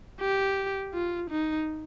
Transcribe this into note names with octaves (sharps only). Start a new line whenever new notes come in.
G4
F4
D#4